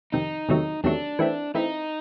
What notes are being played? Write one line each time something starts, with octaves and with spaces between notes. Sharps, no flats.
F2 C3 D#3 D#4
E2 C3 D#3 F#3 A3
E2 C3 D#3 F#3 A3 D4
E3 A3 C4 E4
E3 A3 C4 D#4 E4